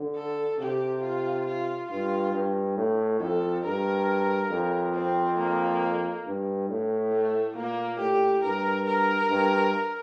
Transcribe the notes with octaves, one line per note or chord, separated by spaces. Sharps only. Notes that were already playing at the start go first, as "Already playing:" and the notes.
Already playing: D3
A4
C3 G4
F4
F4
G2 F4
G2
A2
F2 A4
G2 A#4
F2
C4
A#3
G2
A2
A3
A#2 A#3
A2 G4
G2 A#4
A#4
G2